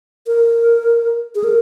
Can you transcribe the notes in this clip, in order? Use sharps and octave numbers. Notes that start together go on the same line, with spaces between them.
A#4
G#4
A#4